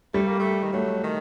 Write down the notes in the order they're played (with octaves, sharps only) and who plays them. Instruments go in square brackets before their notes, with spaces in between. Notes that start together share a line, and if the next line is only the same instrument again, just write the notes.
[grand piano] G3 [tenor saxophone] A3
[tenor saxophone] A#3
A3
D#3
[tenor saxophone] F#3 [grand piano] A3
[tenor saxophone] D#3